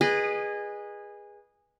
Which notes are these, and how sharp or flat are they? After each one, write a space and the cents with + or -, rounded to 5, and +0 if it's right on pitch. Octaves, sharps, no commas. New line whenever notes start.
G#4 -15 B4 -20 D#5 -25